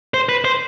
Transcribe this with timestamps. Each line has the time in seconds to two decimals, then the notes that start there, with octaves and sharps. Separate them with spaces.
0.14 C5
0.29 B4
0.44 C5